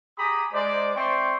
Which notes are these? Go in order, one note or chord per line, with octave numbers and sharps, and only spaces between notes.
G4 G#4 A#5 B5 D#6
G#3 C5 D5
C4 D5 E5 G5 C6 C#6